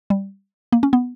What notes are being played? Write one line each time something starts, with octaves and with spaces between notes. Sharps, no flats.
G3
A#3
C#4
B3